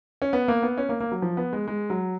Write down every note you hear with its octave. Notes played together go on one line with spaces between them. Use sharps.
C#4
B3
A#3
B3
C#4
A#3
A#3
F#3
F3
B3
G#3
G#3
F#3